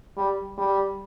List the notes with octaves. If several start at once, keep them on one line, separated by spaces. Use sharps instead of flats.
G3
G3